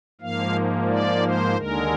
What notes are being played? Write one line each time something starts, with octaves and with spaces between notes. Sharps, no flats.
G#2 F3 A#3 F5
D5
C5
D#2 D3 G#3 A#4